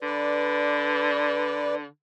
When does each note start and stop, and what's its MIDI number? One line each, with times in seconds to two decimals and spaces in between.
0.03 1.85 50
0.03 1.75 71
0.03 1.75 74